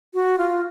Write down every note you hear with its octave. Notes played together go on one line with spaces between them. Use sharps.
F#4
F4